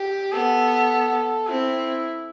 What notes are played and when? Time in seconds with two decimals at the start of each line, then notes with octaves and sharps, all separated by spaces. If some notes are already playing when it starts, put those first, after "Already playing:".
Already playing: G4
0.32 B3 A4
1.48 C4 E4